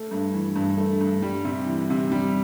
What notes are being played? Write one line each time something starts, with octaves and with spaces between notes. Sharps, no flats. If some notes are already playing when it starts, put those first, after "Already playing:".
Already playing: A3
G2
E3
G2
A3
G2
G3
C3
E3
C3
G3